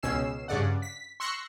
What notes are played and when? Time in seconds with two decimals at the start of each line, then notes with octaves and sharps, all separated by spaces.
0.03 C#2 B2 C#4 E6 C7 E7
0.48 G2 C#3 D5 F#5
0.82 B6
1.20 C6 C#6 E6 F#6 A#6 C#7